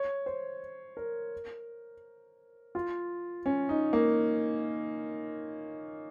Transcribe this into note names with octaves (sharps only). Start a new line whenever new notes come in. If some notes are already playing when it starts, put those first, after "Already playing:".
Already playing: C#5
C5
A#4
F4
C#4
D#4
A#3